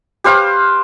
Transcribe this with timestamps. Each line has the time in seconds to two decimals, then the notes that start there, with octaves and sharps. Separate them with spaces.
0.24 G4 B4 C5 F5